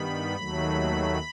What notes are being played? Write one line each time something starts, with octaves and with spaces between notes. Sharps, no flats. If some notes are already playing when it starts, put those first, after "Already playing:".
Already playing: G2 D#3 G3 B3 B5
D#2 D#3 F#3 A3